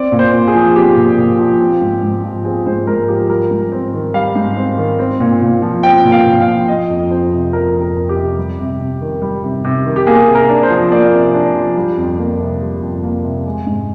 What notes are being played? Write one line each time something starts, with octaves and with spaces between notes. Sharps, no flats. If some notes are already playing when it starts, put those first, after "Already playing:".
Already playing: C4 D5
A#2
C5
A#2
G#4
F3
C4 G4
A#2
A#2
F3
C4
G#2
G#2
F3
C4 G#4
G#2 C5
G#2 A#4
F3 G4
G3 A#4
G#2
C4
D#3
G3 F5
G#2
C4
D#3
C4
A#2
A#2
F3
C4 G5
A#2
F5
A#2
F5
F3
F3 D#5
F2
F2 C5
C3
F3 A#4
F2
A#4
F2
G4
C3
G3
C3
C3
D#3
G3
C3
C3
D#3
G4
A#3 G#4
C3
A#4
D4
C5
F3
A#3 D5
C3
D4
F3
G3
F2
A#3
C3
G3
F2
A#3
C3
G#3
G#2